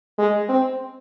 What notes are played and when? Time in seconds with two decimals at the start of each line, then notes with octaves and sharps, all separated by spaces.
0.18 G#3
0.49 C4